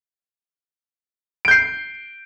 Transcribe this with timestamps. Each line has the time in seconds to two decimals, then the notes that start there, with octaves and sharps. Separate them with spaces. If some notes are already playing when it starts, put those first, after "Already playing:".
1.45 D7
1.48 G6
1.51 C7